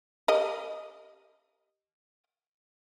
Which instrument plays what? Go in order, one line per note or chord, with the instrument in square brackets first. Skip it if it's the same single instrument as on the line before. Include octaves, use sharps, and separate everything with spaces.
[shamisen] G4 A#4 D#5